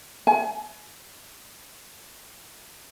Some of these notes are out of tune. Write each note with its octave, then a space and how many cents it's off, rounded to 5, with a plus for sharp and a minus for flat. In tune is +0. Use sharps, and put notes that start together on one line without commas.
G#5 +35